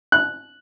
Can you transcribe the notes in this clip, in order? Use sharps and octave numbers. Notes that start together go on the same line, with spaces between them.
F#6